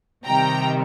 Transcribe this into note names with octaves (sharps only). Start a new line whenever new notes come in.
C3 D#3 G3 G5 A#5